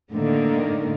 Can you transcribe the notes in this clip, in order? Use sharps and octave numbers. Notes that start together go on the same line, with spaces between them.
A2 D3 D#3 A#3